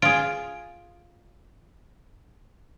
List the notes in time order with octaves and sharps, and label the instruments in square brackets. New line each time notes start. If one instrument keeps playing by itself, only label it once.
[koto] F4 G#4 [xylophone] D7